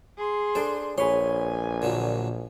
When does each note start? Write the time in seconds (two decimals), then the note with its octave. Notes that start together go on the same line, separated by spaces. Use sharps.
0.17 G#4 C6
0.55 D4 A4 C5
0.98 A#1 G#4 B4 C#5 G#5 C6
1.82 A#2 D3 F#3